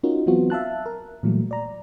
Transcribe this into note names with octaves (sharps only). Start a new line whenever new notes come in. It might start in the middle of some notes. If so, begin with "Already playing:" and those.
C#4 D#4 F4 F#4 A#4
E3 F#3 B3 C4 F4 F#4
E5 F5 A5 F#6
A#4
A#2 E3 F#3 G3 A3
D5 A#5